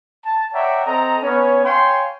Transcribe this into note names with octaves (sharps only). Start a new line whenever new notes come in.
A5
C#5 D5 E5 F#5 G5 A#5
C4 A4 D#5 A#5
B3 C#4 C#5
C#5 F5 G5 G#5 C6